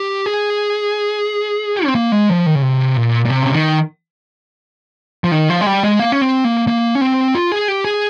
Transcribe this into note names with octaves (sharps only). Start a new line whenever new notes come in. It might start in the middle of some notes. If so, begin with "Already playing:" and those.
Already playing: G4
G#4
C4
A#3
G#3
F3
D#3
C#3
C3
A#2
A#2
C3
C#3
D#3
F3
D#3
F3
G#3
G3
G#3
A#3
C#4
C4
A#3
A#3
C#4
C4
F4
G#4
G4
G#4